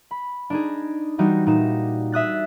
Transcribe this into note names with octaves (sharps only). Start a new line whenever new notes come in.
B5
D4 D#4 G#4
E3 G3 D#4 F#4
A#2 D#4 E7
E5 D#6 F#6 A6